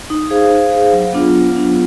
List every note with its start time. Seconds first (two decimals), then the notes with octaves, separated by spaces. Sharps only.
0.10 D#4
0.30 G#4 C5 F5
0.51 D#4
0.71 G#4 C5 F5
0.93 F#3
1.13 B3 D4 F4
1.33 F#3
1.54 B3 D4 F4